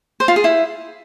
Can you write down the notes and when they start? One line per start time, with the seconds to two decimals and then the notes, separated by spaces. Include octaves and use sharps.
0.20 C5
0.28 F4
0.36 G#4
0.44 E4